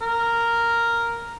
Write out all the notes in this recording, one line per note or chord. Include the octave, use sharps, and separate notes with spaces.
A#4